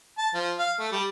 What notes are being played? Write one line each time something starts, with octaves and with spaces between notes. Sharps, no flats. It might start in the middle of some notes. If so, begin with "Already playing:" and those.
A5
F3
F5
A3
G3